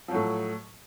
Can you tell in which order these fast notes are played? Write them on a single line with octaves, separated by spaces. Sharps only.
F3 F#3 A2